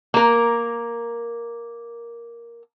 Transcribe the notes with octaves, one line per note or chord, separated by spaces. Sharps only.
A#3 A#4